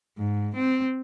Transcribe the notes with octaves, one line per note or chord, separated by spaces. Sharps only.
G#2
C4